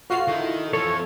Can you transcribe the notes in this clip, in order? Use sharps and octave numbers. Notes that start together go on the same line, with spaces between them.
F2 F4 F#4 D#5 F5 C7
D3 D#3 E4
F2 E3 F3 A4 C#5